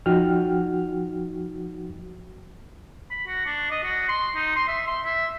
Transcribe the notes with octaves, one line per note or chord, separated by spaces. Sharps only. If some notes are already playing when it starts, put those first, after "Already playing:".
F3 D#4 F#4 F#5 G5 F6
B5
F#4
D4
D#5
F#4
C6
D#4
C6
E5
C6
E5